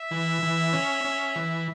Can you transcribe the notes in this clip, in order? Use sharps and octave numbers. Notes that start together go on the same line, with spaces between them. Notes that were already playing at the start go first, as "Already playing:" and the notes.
Already playing: E5
E3
E3
C#4
C#4
E3